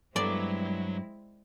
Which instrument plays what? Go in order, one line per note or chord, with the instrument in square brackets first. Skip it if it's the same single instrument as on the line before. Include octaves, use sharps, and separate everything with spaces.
[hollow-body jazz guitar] G2 B3 [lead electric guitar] F#3 A#5 [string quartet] G#3 C4 E4 [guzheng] D5